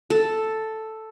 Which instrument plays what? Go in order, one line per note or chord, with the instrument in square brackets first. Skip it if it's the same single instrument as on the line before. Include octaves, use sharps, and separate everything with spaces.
[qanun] A4